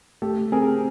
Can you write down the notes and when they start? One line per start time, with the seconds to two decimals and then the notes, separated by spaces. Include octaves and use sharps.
0.22 A3 G4 A4
0.52 C4 G#4 A#4